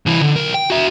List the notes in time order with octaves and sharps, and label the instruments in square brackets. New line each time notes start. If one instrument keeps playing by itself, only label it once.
[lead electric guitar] C2 E3
D3
B1 A#4
G5
F#4 E5